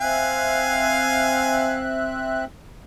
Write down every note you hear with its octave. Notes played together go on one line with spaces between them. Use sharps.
C4 E5 F5 G#5 F#6